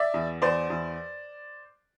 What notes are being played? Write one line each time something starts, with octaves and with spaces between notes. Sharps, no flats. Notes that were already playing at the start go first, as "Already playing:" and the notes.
Already playing: D5 E5
E2
E2 C5 D5
E2